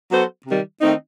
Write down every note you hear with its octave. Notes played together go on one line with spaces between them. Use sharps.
F#3 B3 F#4 A4 C5
C3 D#3 G3
D#3 A3 C4 D#4